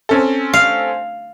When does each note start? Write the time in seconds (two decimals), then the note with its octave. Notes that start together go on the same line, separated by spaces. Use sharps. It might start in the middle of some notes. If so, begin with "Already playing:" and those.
0.09 C4 C#4 A4
0.53 F5